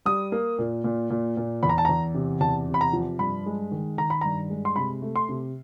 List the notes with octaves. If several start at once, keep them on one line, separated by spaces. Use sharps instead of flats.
G3 D#6
A#3
A#2
A#2
A#2
A#2
E2 B5
A#5
A5
E2 A#5
C3
E2 A5
C3
B5
A#5
F3
G2 B5
G#3
D#3
D#3 A#5
B5
G2 A#5
G#3
C6
C3 B5
A3
C6
C3